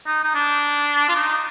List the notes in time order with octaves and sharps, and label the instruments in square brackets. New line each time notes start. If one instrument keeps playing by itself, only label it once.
[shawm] D#4
D#4
D4
F4
D#4